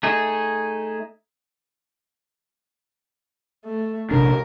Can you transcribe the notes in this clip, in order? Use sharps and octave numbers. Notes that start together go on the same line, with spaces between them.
A3 D#4 G#4
A3
A#1 C3 D4 A#4